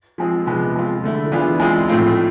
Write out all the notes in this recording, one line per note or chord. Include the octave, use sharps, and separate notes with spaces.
F3 G#3 C4 F4 G#4
C3 F3 G#3 B3
G#3 C4 F4
D3 A3 E4
E3 B3 D4 F4 G#4
G#3 C4 F4 G#4
A2 F3 A3 C4 F4